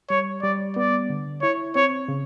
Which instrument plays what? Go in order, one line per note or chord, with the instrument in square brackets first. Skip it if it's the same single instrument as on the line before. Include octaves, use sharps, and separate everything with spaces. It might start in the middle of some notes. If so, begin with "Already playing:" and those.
[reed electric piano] G3 [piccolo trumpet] C#5
[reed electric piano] G3 [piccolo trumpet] D5
[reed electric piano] B3 [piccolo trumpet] D5
[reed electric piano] D3
[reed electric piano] E4 [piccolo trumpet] C#5
[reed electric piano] C4 [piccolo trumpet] C#5
[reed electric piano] C#3